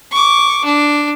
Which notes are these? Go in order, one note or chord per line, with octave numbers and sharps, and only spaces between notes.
C#6 D6
D4